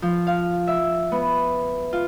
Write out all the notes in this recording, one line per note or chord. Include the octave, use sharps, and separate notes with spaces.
F3
F5
E5
B3
F4